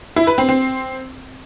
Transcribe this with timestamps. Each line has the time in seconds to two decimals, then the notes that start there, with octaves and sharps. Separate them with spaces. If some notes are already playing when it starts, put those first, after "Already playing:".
0.16 E4
0.27 B4
0.38 C4
0.49 C4